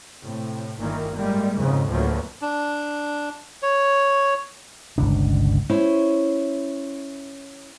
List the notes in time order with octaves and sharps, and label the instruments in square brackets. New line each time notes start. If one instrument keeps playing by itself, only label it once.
[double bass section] A2 C3
G1 A#2 D#3 E3 A#3
A2 G3 G#3 A#3
F2 G#2 C#3
D2 A2 F3 F#3 A#3 B3
[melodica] D4
C#5
[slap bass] G1 C#2 B2 D4
[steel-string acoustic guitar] C#4 E4 C5 C#5